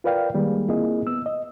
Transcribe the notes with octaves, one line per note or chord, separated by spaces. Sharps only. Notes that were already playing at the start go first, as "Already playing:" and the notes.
F4 A#4 B4 D5 F5 G5
D#3 G3 G#3 A#3 G#4
A#3 C4 E4 F4 G#4 D#5
B3 E6
D#5